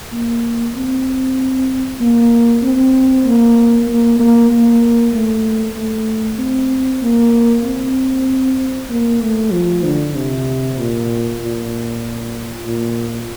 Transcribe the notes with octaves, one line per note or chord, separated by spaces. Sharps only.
A#3
C4
A#3
C4
A#3
A#3
A#3
A#3
A3
A3
C4
A#3
C4
A#3
A3
F3
D3
C3
A#2
A#2
A#2